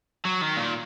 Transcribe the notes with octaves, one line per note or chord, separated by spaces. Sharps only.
F#3
D#3
A#2